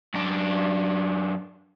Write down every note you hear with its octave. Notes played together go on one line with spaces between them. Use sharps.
F#2 D4